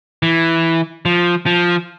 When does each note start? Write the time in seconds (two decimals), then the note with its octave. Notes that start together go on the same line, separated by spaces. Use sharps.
0.23 E3
1.05 F3
1.46 F3